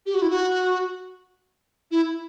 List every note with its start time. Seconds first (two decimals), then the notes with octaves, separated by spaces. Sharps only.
0.06 G4
0.14 F#4
0.22 E4
0.30 F#4
1.91 E4